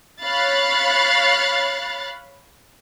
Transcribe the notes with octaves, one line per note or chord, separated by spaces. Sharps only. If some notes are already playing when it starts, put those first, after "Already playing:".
C#5 F5 B5 F#6 A6